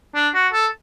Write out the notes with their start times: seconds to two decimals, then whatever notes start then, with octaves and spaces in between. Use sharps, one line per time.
0.15 D4
0.34 F#4
0.53 A4